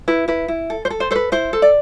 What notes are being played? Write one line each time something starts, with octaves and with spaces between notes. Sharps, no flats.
E4 B4
E4 B4
E4
A4
C5
A4
C5
A4 B4 C5
E4 C5
A4
D5